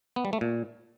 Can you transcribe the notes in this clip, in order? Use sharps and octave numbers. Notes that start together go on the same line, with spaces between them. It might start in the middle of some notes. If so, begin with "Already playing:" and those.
B3
G3
A3
A#2